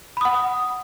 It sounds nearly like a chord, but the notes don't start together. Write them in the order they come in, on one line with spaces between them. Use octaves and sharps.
B5 D#6 F#5